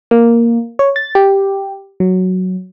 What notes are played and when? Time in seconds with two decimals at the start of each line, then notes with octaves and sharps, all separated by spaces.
0.11 A#3
0.79 C#5
0.96 A6
1.15 G4
2.00 F#3